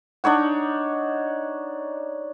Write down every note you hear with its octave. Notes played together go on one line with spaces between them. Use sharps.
D4 D#4 C#5 F#5